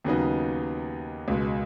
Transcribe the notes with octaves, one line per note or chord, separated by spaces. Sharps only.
D#2 C#3 F#3 B3 D#4
C#2 B2 G#3